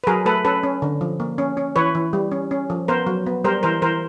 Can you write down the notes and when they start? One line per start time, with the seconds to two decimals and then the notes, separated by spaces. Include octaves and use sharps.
0.04 B4
0.07 F#3 G#4 A#4
0.25 A3 A4 B4
0.45 C#4 A4 B4
0.63 C#4
0.82 D3
1.01 F3
1.20 A#3
1.38 C#4
1.57 C#4
1.76 E3 B4 C#5
1.95 E3
2.13 G3
2.31 C#4
2.51 C#4
2.70 F3
2.88 B3 A#4 C5
3.07 F#3
3.26 B3
3.44 G3 A#4 C5
3.63 E3 A#4 C5
3.82 E3 A#4 C5